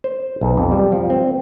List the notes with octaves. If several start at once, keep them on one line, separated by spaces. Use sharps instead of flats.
C5
B1
F2
G3
F3
C4